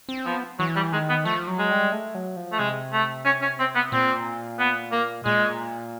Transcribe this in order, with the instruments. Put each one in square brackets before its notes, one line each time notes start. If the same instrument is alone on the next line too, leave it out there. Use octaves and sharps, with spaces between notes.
[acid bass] C4
[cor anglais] F3 [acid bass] B3
[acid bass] E3 [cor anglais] F#3
[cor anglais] G3
[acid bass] D#3 [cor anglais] G#3
[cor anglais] B3
[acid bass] F3 [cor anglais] A3
[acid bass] F#3
[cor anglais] G#3
[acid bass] G3
A3
F#3
F3
[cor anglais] A3
[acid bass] C3 [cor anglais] G#3
[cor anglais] A3
C#4
C#4
C4
B3
[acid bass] A#2 [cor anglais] C4
[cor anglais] B3
A#3
[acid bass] A#2 [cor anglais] G#3